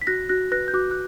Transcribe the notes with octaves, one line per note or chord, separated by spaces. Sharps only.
B6
F#4 F#6 A#6
F#4 F#6 A#6
B4 F#6 A#6
G6
F#4 D6 F#6
F#6